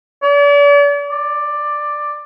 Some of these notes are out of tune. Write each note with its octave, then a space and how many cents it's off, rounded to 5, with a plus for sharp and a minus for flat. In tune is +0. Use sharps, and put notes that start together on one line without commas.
D5 -40
D5 +10